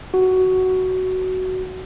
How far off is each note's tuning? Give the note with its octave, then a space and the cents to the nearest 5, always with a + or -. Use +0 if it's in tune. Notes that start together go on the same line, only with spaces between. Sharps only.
F#4 +10